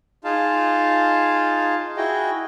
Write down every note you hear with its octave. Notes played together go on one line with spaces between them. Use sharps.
D#4 F4 G#4 F5 A5
E4 F#4 G#4 D#5 G5